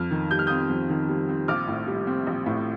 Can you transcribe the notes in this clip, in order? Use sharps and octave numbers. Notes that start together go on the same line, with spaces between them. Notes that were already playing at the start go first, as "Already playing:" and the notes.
Already playing: F2 F6
D#3
G3 G6
F6
C4 D#6 G6
F2
D#3
G3
C4
A#1 D6 F6
A2
G3
C4
A#1
A2